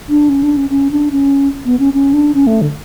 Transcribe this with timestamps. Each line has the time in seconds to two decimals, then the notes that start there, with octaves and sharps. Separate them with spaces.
0.09 D4
0.29 C#4
0.43 D4
0.57 C#4
0.70 C#4
0.91 D4
1.11 C#4
1.66 B3
1.79 C#4
1.93 C#4
2.13 D4
2.34 C#4
2.47 A3
2.62 D3